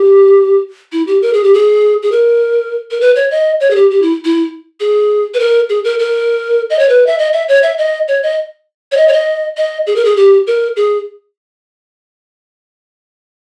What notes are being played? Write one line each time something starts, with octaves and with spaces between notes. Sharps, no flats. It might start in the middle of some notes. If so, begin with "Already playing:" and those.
Already playing: G4
E4
G4
A#4
G#4
G4
G#4
G#4
A#4
A#4
B4
C#5
D#5
C#5
G#4
G4
G4
E4
E4
G#4
B4
A#4
G#4
A#4
A#4
D#5
C#5
B4
E5
D#5
E5
C#5
E5
D#5
C#5
D#5
C#5
D#5
C#5
D#5
D#5
G#4
A#4
G#4
G4
A#4
G#4